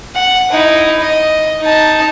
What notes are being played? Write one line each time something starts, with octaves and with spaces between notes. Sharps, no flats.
F#5
D#4 E4
D#5
D#4 A5